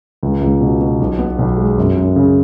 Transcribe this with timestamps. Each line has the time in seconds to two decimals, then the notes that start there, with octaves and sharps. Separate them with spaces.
0.23 C#2
0.41 C#2
0.61 B2
0.81 B2
1.00 B1
1.19 B3
1.39 B1
1.58 G#3
1.78 F#2
1.97 F#2
2.16 C#3